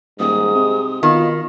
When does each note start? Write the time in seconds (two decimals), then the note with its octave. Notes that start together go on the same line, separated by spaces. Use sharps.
0.19 D#1 G#2 D#6
0.55 C3
1.03 B2 D#3 F4